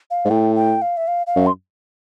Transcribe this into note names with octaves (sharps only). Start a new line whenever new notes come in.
F5
G#2
A2 G5
G5
F5
E5
F5
F5
F#2
C6